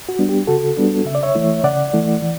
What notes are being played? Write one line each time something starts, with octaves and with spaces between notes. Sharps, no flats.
F#4
G3 B3 D4
G4
C#3 F#4 A4
G3 B3 D4
C#3 E5
D5
C#5 E5
E3 A3 E4
C#3 D5 F#5
E3 A3 E4
E3